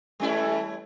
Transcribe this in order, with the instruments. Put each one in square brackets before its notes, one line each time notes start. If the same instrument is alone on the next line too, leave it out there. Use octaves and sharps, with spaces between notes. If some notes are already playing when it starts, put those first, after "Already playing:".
[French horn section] E3 A3 [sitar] G3 C#4 E4